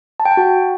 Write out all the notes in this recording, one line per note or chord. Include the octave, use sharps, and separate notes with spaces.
A5
G5
A5
F#4